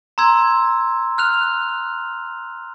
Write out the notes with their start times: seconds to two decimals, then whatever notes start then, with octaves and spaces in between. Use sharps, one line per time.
0.18 A#5 C6 E6 G#6
1.18 F6 F#6 F7